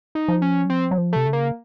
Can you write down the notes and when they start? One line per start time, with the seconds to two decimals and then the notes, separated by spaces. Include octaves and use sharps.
0.15 D#4
0.28 F3
0.42 C#4
0.66 F#3
0.70 F3 C4
0.91 F#3
0.98 F3
1.13 C3 A3
1.26 C#3
1.33 A#3